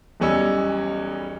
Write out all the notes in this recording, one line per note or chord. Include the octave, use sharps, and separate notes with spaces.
B1 E2 G3 C#4 D#5 E6